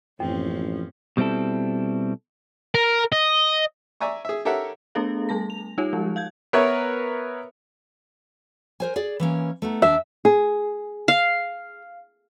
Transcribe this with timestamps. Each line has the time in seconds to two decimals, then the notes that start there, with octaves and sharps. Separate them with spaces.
0.20 A1 F#2 F3 A#3 C4 C#4
1.17 B2 G3 C4 E4 A4
2.75 A#4
3.12 D#5
4.00 D5 E5 G#5 A#5 C#6
4.25 G#4 E5
4.45 G4 A4 A#4 C#5 E5 F#5
4.95 A3 B3 D4 G#4 A4 F5
5.29 G3 A3 A5 A#6
5.50 F7
5.78 G3 D#4 F4 G4 C#5
5.93 F3 G#3
6.16 F5 G6 G#6
6.53 B3 A#4 B4 C#5 E5
8.80 A#4 C5 G#5
8.96 G#4 D5
9.20 E3 A#3 C#4
9.62 A3 B3 D#4
9.82 D#2 D4 E5
10.25 G#4
11.08 F5